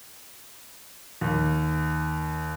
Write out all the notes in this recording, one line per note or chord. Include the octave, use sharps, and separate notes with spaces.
D#2